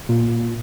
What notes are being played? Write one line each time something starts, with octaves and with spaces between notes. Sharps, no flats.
A#2